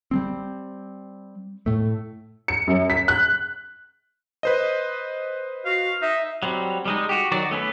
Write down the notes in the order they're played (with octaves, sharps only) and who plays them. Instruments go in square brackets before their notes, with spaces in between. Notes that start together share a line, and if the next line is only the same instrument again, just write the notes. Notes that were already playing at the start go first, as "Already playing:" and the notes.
[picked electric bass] G3 G#3 C4
A2 A3
[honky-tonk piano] C#7
F#2
B6
F#6
[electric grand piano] B4 C5 D#5
[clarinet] F#4 [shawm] F5
[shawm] D#4 [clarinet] E5
[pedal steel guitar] F#3 G3 C4
G3 G#3 D#4
F#4 G4
D#3 F#3 D#4 F#4 D5
A3 B3 C#4 B4